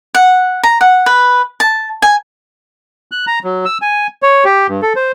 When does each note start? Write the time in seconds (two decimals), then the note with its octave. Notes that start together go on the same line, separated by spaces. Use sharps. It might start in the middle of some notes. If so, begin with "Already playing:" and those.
0.15 F#5
0.63 A#5
0.81 F#5
1.06 B4
1.60 A5
2.02 G#5
3.12 F#6
3.27 A#5
3.44 F#3
3.65 E6
3.82 G#5
4.22 C#5
4.45 G4
4.69 G2
4.82 A4
4.96 C5